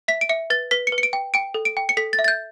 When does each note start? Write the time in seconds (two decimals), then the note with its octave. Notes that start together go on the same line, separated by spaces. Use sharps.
0.08 E5 B6
0.21 D7
0.29 E5 C#7
0.50 B4 A6
0.71 B4 B6
0.87 C#7
0.92 B4
0.98 C#7
1.03 D7
1.13 G5
1.34 G5 D7
1.54 A4
1.65 D7
1.77 G5
1.89 C#7
1.97 A4 B6
2.13 A6
2.19 E5
2.24 A6
2.28 G6